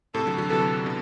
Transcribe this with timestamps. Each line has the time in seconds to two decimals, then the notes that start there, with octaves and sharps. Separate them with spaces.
0.14 A2 C3 A4
0.26 D3 F#3
0.38 D3 F#3
0.50 C3 E3 A4
0.86 B2 D3